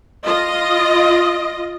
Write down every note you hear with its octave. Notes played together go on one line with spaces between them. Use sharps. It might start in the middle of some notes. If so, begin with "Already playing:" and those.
F4 D#5